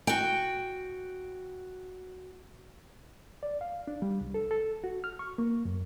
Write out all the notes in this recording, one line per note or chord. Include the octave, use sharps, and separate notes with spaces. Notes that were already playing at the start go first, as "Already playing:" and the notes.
F#4 G5
D5
F5
D4
G3
C2
A4
A4
F#4
F6
C#6
A#3
F#2